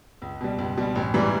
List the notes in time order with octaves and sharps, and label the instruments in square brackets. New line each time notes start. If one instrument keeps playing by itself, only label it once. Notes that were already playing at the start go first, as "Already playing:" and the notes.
[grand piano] C#2
B2 G3
C#2
B2 G3
A1
G#2 E3 G3